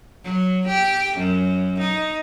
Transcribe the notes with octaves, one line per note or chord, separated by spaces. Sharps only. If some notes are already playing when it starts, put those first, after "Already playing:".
F#3
G4
F#2
D#4